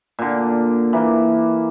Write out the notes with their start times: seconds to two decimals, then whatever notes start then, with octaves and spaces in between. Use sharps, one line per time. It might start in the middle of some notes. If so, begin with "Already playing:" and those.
0.19 A#2 D3
0.93 E3 A#3